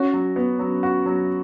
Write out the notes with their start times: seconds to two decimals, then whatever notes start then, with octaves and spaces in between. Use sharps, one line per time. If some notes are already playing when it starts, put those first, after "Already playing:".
Already playing: C#4 F#4
0.13 F#3
0.36 B3
0.59 F#3
0.83 F#4
1.06 F#3